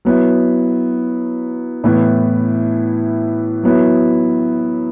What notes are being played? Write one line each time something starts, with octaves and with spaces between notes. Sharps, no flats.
F#3 B3 E4
A2 E3 B3
F#3 B3 E4